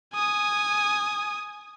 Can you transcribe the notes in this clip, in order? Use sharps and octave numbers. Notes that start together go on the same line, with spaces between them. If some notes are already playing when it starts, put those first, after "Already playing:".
G#5 D#6